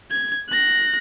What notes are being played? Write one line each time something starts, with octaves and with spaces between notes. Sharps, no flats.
G#6
F#6 A#6